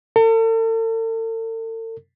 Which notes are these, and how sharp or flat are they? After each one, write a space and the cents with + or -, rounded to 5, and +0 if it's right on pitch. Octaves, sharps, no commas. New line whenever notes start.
A4 +40